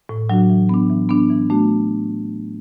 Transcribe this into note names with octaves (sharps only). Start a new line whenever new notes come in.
A2
F#3 D4 F#4
E3
B3 D4
E3
B3 D4
E3
A3 D4 F#4